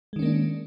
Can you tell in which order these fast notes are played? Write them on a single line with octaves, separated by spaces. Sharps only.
G#3 D#3 C#4 A#3 D4